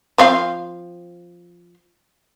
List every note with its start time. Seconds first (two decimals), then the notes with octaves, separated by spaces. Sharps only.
0.18 F3 C4 F5